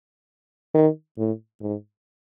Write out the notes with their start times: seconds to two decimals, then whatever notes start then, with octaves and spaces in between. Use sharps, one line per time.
0.75 D#3
1.18 A2
1.61 G#2